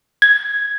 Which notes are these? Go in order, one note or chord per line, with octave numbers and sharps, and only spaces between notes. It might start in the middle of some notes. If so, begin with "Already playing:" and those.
G#6